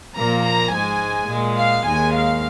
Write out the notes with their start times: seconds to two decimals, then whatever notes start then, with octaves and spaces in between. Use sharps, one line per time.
0.17 A#2 F3 A#3 A#5
0.46 A#5
0.73 G#2 G#3 G#5
1.30 A#2 G#3
1.58 F5
1.86 D#2 D#3 G#3 G#5
2.14 F5